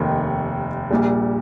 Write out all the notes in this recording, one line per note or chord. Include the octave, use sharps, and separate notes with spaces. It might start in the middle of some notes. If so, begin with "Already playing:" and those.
Already playing: F1 D#2 D#3
A#1 A#2 G3